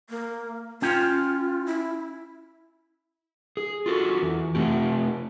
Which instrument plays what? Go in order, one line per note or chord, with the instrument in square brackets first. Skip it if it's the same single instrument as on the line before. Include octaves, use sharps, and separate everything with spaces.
[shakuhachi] A#3
[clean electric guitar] C#4 G5 [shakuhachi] F4
[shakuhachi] E4
[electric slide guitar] G#4
F4 F#4 A4
E2
C3 A3 C4 G4